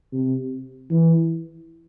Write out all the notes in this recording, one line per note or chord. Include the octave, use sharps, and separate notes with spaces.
C3
E3